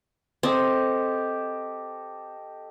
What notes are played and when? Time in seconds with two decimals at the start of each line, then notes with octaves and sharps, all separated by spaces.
0.43 C4 G4 A4 D#5